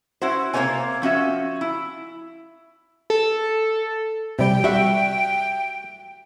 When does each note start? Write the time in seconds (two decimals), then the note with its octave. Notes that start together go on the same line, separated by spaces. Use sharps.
0.22 C#4 E4 F#4 C5
0.53 C3 A#3 F#4 C5 C#5 G#5
1.02 F3 C#4 F#4 E5
1.61 E4
3.10 A4
4.39 C3 G3 G5
4.64 G3 F#4 E5